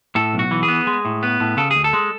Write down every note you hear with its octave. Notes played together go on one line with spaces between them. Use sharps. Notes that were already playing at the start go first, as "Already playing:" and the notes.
A2 A4
B1
F#4
E3
G#4
B3
G#3
A2
B3
A2
C#3 A4
D2 G#4
A4
G#3